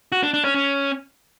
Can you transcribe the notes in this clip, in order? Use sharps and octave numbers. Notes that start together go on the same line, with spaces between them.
F#4
D4
D4
C#4
C#4